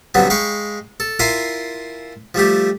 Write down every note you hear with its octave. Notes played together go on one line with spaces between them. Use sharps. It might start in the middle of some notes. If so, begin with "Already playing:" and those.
G2 D3 F#3 B3 C4
G#3 F5 G5 B5 C#6
A4
E4 F4 A#4 E5 G#5 C6
F3 G3 A3 G4